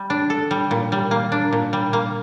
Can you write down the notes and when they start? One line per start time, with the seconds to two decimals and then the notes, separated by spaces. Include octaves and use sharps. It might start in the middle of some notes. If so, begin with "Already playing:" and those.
Already playing: G3
0.10 D4
0.30 A4
0.51 G3
0.71 A#2
0.92 G3
1.11 A#3
1.32 D4
1.53 A#2
1.73 G3
1.93 A#3